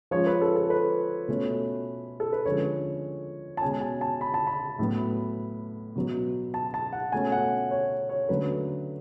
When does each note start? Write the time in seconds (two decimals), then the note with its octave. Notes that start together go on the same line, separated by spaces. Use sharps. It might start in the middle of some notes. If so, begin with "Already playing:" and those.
0.11 F3 G#3 C#4 C#5
0.27 B4
0.41 A4
0.56 A4
0.70 B4
1.28 B2 A3 C#4
2.20 A4
2.32 B4
2.45 D3 F3 G#3 C#4 C#5
3.57 A5
3.61 B2 G#3 C#4 G#5
3.81 G#5
4.01 A5
4.21 B5
4.34 A5
4.47 B5
4.79 A2 F#3 B3
5.96 B2 F#3 B3
6.54 A5
6.74 A5
6.93 F#5
7.12 B2 A3 C#4 G#5
7.32 F#5
7.71 C#5
8.09 C#5
8.29 D3 F#3 A3 C#4 B4